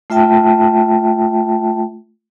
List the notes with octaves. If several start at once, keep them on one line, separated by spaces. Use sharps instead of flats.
A3 F4 E5 G5 A5